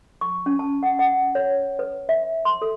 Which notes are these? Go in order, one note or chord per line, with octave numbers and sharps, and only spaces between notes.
C#6
C#4
A5
F#5
F#5
C#5
B4
E5
C6
A4